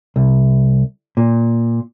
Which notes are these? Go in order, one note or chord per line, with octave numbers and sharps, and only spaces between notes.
C2
A#2